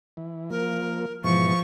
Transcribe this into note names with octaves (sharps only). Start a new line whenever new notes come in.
E3
F3 A#3 A#4
G#2 B2 E3 F3 C#6